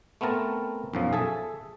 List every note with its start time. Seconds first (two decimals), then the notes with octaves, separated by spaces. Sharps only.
0.21 A3 B3 C4 A#4 A5
0.93 B1 F#2 F3
1.13 G#4 A4 E5